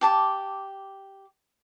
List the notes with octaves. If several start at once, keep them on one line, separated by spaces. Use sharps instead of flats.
G4 A5 D6